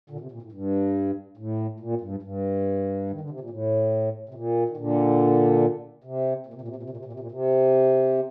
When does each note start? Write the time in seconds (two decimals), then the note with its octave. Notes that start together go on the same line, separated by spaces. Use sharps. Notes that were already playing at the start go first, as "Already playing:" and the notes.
0.10 A#2 D3
0.20 C3
0.32 A#2
0.42 A2
0.52 G2
1.37 A2
1.80 A#2
2.01 G2
2.22 G2
3.11 D#3
3.21 D3
3.30 C3
3.40 A#2
3.50 A2
4.29 C3
4.34 A#2
4.69 D#3
4.77 A#2 D3
6.04 C3
6.46 A#2
6.54 C3
6.61 A#2
6.68 C3
6.76 A#2
6.83 C3
6.90 A#2
6.97 C3
7.05 A#2
7.13 C3
7.20 A#2
7.31 C3